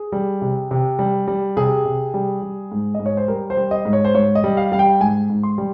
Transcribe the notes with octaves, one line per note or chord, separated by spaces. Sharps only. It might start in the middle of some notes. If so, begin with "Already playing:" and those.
Already playing: G#4
G3
C3
C3
G3
G3
C3 G#4
C3
G3
G3
G#2
D#5
G#2
C#5
C5
G3 A#4
C5
G3
D#5
G#2
C#5
C5
G#2 C#5
D#5
G3
F5
G3 F5
G5
G#2 G#5
G#2
C6
G3